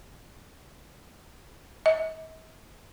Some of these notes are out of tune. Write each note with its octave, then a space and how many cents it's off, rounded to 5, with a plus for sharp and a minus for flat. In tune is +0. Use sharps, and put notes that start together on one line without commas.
D#5 +45